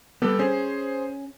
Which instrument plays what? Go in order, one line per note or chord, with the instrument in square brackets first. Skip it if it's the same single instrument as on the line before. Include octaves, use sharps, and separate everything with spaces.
[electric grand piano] G3 G4 A4 [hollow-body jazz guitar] B3
[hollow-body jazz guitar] C#4 [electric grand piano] G#4 C5